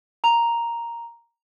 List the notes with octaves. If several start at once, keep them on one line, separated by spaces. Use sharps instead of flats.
A#5 F7